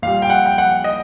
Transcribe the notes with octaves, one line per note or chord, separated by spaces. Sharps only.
A#2 G3 F5
G5
F#5
G5
F#5
D#5